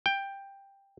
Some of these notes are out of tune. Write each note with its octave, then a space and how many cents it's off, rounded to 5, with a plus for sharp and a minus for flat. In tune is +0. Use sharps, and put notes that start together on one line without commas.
G5 +10